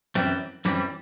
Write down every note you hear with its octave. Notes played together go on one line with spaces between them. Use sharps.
F#2 E3 G3 C4
F#2 E3 G3 C4